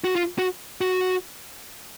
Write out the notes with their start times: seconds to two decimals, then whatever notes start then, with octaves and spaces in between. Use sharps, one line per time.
0.04 F#4
0.16 F4
0.39 F#4
0.81 F#4